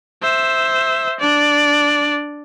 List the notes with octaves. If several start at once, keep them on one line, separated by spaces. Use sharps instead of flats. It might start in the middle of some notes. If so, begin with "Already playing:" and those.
C5 E5
D4 D5